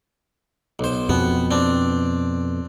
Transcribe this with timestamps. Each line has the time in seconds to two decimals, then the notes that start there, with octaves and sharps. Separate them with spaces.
0.79 B1 C5
1.09 F2 B2 B3
1.51 C4 D4